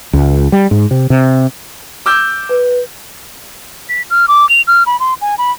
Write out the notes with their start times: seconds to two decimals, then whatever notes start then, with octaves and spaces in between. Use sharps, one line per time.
0.13 C#2
0.52 G3
0.71 G#2
0.91 C3
1.10 C3
2.06 D6 E6 G6
2.50 B4
3.89 B6
4.10 F6
4.28 D6
4.49 F7
4.67 F6
4.86 B5
5.00 C6
5.21 G#5
5.38 B5